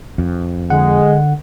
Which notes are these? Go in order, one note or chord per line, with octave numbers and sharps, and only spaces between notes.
F2
D3 G#3 F#5